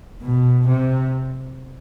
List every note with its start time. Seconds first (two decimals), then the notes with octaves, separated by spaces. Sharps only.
0.23 B2
0.68 C3